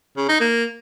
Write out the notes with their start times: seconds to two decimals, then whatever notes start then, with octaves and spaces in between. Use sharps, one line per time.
0.17 C#3
0.29 D#4
0.41 A#3